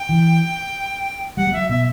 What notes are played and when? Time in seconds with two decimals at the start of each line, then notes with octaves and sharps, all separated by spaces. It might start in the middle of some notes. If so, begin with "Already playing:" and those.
Already playing: G5
0.09 E3
1.37 G3 F#5
1.47 G3
1.53 F#3 E5
1.69 B2 E5